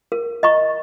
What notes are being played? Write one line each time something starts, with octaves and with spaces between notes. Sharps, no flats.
A#4
D#5 A#5 C#6